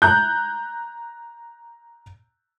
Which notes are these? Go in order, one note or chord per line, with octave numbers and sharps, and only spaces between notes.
A#5 F#6 G6